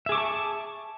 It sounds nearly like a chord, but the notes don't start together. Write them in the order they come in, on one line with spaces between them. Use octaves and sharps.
E5 G#4 D6 C#6 A5